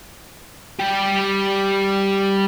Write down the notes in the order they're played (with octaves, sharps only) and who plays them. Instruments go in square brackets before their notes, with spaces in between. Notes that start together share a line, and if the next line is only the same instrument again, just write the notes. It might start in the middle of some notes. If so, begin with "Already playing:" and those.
[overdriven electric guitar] G3 G4